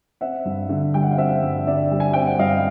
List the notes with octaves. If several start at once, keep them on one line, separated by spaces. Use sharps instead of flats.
C4 E5 F#5
G2
D3
G3 G5
F#5
F5
C4 E5 F#5
G2
D3 D5 E5
G3
G#5
C4 G5
F#5
G2 D#5 F5